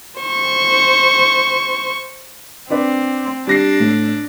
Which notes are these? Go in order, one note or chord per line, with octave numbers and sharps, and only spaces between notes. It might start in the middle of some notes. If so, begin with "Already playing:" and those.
C5 C#6
C4 D4 B4 D5
G3 D4 A#6 C7
A2